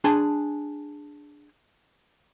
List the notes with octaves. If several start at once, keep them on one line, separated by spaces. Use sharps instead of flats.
D4 G#4 G#5 A5 C6